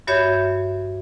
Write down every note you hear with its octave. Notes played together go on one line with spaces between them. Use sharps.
G2 F#4 C#5 E5 G6 G#6